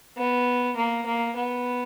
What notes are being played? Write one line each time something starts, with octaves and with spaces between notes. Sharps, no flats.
B3
A#3
A#3
B3